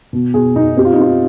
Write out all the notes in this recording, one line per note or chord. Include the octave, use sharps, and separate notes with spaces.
B2
B2 G#4
B2 D#4
C4 G4
F4
D#4
C4 F4